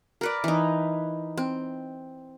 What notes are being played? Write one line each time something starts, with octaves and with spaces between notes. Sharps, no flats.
A#4 B4 D5
E3 D#4
C4